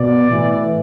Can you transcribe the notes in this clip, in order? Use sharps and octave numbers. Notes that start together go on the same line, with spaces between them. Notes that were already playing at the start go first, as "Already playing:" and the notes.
Already playing: B2 D5
A2 E3